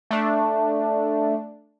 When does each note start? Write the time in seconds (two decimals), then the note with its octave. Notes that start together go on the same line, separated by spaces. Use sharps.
0.11 A3 D4